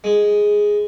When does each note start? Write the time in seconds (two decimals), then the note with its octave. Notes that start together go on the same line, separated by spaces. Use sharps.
0.04 G#3